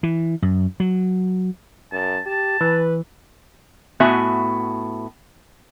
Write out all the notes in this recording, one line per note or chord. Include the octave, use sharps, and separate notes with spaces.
E3
F#2
F#3
F#2 A5
G4 A5
E3 B4
A2 B3 F#4 E5 G#5